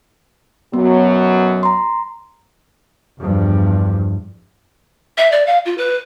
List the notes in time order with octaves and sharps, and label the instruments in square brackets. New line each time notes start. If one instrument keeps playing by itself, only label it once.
[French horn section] F#2 B2 F#3 [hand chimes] B3
[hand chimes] A#5 C6
[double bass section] E2 G2 F3
[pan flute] E5
D5
F5
F4
B4